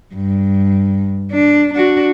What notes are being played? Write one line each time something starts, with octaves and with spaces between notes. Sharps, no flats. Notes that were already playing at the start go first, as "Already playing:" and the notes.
G2
D4
D4 F#4